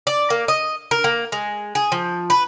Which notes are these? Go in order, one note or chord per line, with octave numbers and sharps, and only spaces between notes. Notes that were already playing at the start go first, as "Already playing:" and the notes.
D5
A#3
D#5
A#4
A#3
G#3
G#4
F3
B4